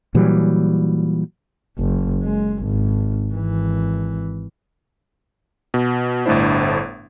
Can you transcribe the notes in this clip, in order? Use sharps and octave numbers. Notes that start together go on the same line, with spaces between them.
A#2 E3 F#3 G3
F#1
G#3
G#1
G#1 E3
B2
G1 A2 A3 D4 E4 C5